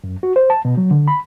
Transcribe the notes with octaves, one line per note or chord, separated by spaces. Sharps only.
F#2
F#4
C5
A5
B2
F#3
D3
B5